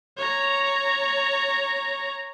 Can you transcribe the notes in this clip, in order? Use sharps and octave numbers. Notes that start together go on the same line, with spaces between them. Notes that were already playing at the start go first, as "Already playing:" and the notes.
C#5 A#5